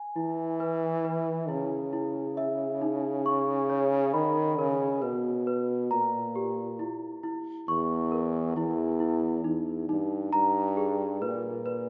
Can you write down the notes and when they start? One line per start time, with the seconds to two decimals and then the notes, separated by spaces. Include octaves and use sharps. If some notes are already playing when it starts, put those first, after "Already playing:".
Already playing: G#5
0.16 E3 E4
0.60 B4
1.05 B4
1.49 C#3 E4
1.93 E4
2.37 E5
2.81 D#4
3.26 C#6
3.70 C#5
4.14 D#3 B5
4.58 C#3 A#4
5.02 B2 B4
5.47 B4
5.90 A#2 A#5
6.36 G4
6.79 E4
7.23 E4
7.68 E2 C#6
8.12 A#4
8.56 E2 E4
9.00 E4
9.44 E2 D#4
9.89 G2 D#4
10.33 G2 A#5
10.77 G#4
11.22 A#2 B4
11.66 B4